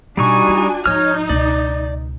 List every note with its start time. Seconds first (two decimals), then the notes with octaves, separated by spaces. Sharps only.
0.17 B2 G3 D4 D#4 F#4 G#5 C#6
0.48 F4
0.86 G#2 F3 D#4 C#5 F6
1.29 C#2 B2 D5